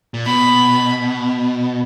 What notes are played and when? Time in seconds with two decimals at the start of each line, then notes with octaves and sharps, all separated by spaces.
0.14 A#2
0.26 B2 B5